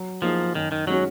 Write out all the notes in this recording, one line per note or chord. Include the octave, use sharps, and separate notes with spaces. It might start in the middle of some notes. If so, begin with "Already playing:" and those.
Already playing: F#3
F3 A#3 D#4 G#4
F#2 D#3
D#3
D#3 F#3 G#3 C#4 F#4